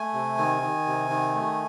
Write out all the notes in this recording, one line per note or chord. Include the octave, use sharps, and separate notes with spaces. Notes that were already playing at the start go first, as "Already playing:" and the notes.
Already playing: A3 G#5
C3
D#3
D#3
C3
D#3
A3